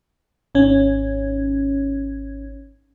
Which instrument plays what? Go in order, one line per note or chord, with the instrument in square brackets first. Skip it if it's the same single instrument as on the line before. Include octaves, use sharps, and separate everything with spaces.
[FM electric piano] G#1 C#4